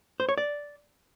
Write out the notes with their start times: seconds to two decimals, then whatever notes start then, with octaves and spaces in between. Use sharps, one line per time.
0.20 C5
0.29 C#5
0.38 D5